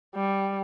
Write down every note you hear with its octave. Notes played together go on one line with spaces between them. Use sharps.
G3